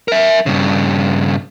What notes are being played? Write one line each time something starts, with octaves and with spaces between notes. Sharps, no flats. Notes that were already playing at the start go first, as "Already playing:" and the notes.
A#4 E5
G2 C#3